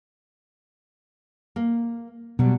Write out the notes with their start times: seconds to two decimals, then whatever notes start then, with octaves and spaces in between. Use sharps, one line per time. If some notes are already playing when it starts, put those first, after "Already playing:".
1.56 A#3
2.39 B2 F#3 G3